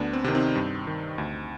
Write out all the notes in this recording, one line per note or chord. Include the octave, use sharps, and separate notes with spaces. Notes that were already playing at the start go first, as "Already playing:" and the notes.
Already playing: D2 B3 D4
C4
C3 D#3
C4 D#4
G2
D#3
D2